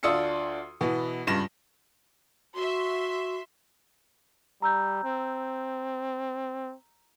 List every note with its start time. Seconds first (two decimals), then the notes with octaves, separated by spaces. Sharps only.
0.03 D2 D4 F4 D#6 E6 C#7
0.81 B2 E3 B3
1.27 C#2 G2 A#6 E7
2.55 F#4 E5 C6
4.62 G3 A#5 E6 G6
5.04 C4